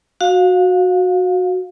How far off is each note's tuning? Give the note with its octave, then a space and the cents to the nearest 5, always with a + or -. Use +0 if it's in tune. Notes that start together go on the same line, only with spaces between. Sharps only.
F#4 -10 F5 +20